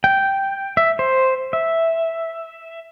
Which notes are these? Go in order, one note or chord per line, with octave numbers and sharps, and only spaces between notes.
G5
E5
C5
E5